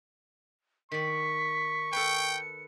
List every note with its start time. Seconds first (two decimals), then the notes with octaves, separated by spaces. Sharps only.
0.92 D#3 D5 C#6 B6
1.92 A4 B4 G5 C#7